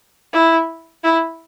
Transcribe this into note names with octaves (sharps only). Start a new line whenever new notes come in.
E4
E4